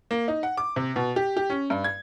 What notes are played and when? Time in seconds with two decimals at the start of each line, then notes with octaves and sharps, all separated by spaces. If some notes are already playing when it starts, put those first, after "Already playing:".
0.11 A#3
0.28 D#4
0.43 F#5
0.57 D6
0.76 C3
0.96 B2
1.16 G4
1.37 G4
1.50 C#4
1.70 G2
1.84 G#6